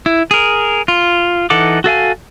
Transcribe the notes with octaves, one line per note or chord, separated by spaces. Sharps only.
E4
G#4 A#4
F4
E3 D#4 A4 F#5 D6
F#4 A4 F5 G#5